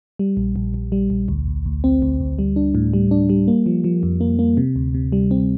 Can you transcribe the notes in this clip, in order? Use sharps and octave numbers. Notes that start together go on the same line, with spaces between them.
G3
A#1
A#1
A#1
G3
A#1
D2
D2
D2
C4
D2
D2
G3
D4
A2
G3
D4
G3
A#3
F3
F3
F2
A#3
A#3
C3
D2
C3
G3
C4